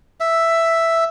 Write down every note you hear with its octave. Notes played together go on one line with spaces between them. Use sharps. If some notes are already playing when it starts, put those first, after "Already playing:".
E5